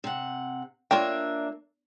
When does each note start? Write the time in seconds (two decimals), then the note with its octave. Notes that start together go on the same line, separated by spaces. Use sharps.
0.04 C3 F#5
0.91 A#3 D4 F4 C#5 E5 G5